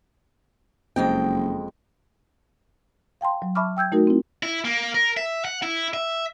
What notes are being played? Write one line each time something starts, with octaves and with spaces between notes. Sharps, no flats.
F#1 F2 G#3 G5
F5 G5 A5 C6
F#3
E5 A5 B5 C#6 D6 F6
G5 E6 G6 G#6
A3 D#4 F#4 A#4
C4 E4
E4
A#3
A#4
E5
F#5
E4
E5